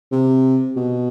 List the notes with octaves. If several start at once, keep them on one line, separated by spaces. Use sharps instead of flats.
C3
B2